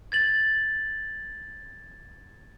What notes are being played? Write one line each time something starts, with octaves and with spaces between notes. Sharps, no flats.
G#6 A6 F#7